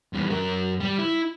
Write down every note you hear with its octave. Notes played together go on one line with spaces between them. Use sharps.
E2 G3
F#2 A#4
G3
E4